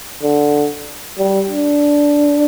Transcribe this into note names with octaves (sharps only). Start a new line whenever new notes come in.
D3
G3
D4